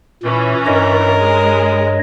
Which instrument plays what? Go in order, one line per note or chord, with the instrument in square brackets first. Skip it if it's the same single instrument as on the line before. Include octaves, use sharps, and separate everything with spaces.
[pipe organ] A#2 [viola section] E3 C#4
[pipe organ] G2 C#5 D#5 [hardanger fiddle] A#4
[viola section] G#3